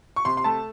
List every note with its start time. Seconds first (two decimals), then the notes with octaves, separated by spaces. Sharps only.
0.16 C#6
0.25 C3 C6
0.37 C6
0.44 A3 A5